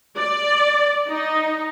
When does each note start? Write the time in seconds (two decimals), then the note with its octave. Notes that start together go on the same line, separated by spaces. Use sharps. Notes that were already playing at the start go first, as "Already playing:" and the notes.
0.17 D5
1.08 D#4